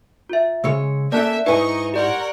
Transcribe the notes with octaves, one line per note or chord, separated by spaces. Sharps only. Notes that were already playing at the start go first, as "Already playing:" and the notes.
F4 E5
C#3 G#3 C#5 E6
A#3 C#4 A4 D5 E5 A5 F#6
G#2 D#4 E4 B4 D#5 G#5 C#6
G4 A#4 C#5 D5 F#5